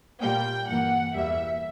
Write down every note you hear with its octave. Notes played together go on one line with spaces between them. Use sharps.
A#2 G3 A#3 G5
G2 E3 A#3 F#5
E2 B2 G3 A#3 E5